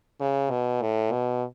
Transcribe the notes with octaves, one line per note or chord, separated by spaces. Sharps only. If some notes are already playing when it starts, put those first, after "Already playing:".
C#3
B2
A2
B2